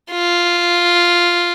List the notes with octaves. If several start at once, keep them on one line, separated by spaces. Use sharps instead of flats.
F4